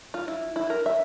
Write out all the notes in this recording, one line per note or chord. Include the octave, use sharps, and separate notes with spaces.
F4
E4
E4
A#4
E5